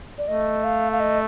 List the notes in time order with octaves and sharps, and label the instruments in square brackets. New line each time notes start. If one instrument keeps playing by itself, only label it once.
[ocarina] D5
[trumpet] A3 [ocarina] D#5
[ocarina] F5
F5
D#5